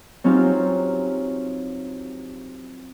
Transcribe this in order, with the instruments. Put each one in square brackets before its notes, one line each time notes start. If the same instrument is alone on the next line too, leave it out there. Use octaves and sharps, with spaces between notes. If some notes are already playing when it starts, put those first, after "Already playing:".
[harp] F#3 C4 C#4 D#4 F4 G4